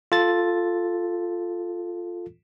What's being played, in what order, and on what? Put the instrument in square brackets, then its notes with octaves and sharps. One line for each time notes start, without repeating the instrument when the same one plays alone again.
[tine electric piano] F4 A4 A6